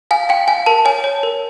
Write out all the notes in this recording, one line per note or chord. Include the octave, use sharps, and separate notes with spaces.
F5 G#5
F5 G5
F5 G#5
A#4 A5
C#5 G#5
C#5
A#4